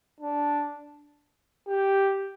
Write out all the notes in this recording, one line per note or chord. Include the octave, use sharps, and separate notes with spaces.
D4
G4